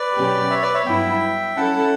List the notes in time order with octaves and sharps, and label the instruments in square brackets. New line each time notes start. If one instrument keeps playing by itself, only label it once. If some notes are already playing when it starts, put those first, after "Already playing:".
Already playing: [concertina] B4 D5
[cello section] B2 F#3 C#4 G4
[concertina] C#5 E5
B4 D5
C#5 E5
[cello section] G2 F#3 B3 E4 [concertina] E5 G5
[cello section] F#3 C#4 E4 A4 [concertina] F#5 A5